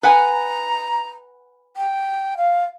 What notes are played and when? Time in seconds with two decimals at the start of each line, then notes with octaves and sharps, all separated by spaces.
0.03 B4 F#5 G#5 A#5
1.77 G5
2.37 F5